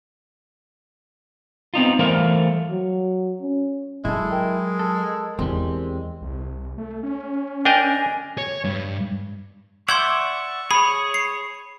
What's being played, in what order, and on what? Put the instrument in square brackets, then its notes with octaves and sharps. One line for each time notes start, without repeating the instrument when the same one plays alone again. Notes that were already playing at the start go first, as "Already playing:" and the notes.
[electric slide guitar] B3 C4 D#4 F4
E3 G3 A3 A#4 C5 F5
[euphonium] F#3
C#4
[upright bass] F#3 [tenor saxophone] G#3 [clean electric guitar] E4 A4
[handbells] A#4 G5
[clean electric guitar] A4
[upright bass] E2 [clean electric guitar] G3 G#3 C4
[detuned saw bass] C2
A3
C#4
[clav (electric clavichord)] D4 A#4 D#5 [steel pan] G5 [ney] G#5
[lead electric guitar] C#5
G2
[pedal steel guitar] D5 E5 F#5 [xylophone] C6 G6 G#6 [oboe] C#6
[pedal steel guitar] G#4 C#5 [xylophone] B5
[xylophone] C7